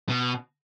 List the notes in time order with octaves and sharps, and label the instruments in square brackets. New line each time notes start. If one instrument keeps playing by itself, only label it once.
[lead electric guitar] B2